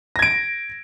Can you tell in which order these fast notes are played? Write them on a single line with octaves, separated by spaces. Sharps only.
A#6 G#6 D7